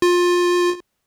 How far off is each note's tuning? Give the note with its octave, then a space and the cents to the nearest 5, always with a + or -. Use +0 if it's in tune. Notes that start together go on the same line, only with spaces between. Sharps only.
F4 +20